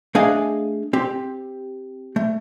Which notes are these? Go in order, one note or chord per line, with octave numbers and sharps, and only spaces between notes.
A3 D4 G#4 D#5 F5 G#5
C4 G4
A3